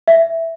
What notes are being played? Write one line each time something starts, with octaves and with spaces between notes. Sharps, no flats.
E5